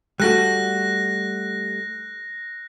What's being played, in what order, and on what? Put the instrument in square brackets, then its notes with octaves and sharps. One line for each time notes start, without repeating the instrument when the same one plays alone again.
[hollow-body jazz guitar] G3 A3 F#4 [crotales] F#6 A#6